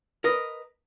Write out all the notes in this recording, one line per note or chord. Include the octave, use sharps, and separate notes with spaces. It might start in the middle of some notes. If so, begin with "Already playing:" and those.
A#4 B4 D#5